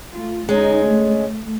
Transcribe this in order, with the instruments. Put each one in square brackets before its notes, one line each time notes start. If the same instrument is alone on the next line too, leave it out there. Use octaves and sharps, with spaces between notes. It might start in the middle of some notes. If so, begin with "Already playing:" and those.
[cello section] A3 F4
[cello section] D2 D#4 [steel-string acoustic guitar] G#3 C#4
[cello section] A3